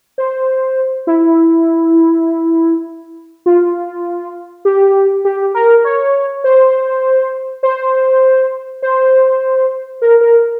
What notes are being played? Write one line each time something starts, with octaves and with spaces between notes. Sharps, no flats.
C5
E4
F4
G4
G4
A#4
C#5
C5
C5
C5
A#4
A#4